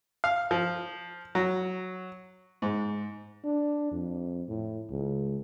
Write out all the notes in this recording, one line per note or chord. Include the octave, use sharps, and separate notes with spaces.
F5
F3
F#3
G#2
D4
F2
A2
C#2